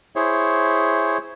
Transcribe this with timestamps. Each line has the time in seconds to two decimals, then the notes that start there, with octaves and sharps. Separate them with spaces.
0.16 E4 G#4 C5 C#5